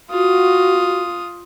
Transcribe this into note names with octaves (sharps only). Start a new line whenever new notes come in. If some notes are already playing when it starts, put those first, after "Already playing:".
F4 F#4 D#6